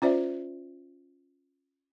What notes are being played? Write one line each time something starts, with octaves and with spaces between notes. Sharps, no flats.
C#4 F4 C5 D5 E5